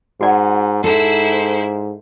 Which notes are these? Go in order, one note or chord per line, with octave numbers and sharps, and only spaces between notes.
G#2 F#4 D5 F#5
G#2 E4 A4 C5